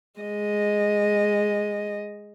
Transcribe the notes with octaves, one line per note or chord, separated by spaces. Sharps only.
G#3 D#5